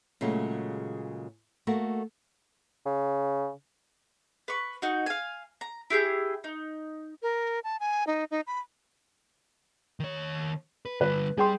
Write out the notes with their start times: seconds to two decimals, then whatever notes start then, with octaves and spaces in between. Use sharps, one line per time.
0.21 A#2 C#3 F#3 G#3 A3
1.67 A3 A#3 F#4
2.86 C#3
4.48 B4 C#6
4.82 D#4 F#4
5.06 F5 G#5
5.61 A#5
5.90 E4 G4 G#4 G6
6.44 D#4
7.22 A#4
7.64 A5
7.80 G#5
8.07 D#4
8.31 D#4
8.47 B5
10.00 D#3 C#5
10.85 B4
11.01 D3 G3 B4
11.38 G3 G#4 G5 C6